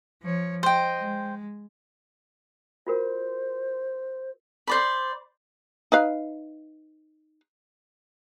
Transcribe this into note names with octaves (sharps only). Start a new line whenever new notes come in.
F3 C#5
C5 D#5 G5
G#3
F4 F#4 A#4 C5
C5 D5 B5
D#4 B4 F5